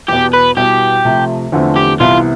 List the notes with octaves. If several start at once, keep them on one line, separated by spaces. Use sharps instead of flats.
E2 B2 B3 G4
B4
B2 G3 B3 E4 G4
C3 F3 A3
E2 D3 F3 A3 C4
G4
C2 C3 E3 B3 E4 F4